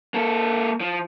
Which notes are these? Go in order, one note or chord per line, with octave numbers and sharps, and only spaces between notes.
A#3 A4
F3